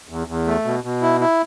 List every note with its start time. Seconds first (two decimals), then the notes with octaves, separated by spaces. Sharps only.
0.09 E2
0.27 E2
0.46 A3
0.65 B2
0.84 B2
1.02 E4
1.20 E4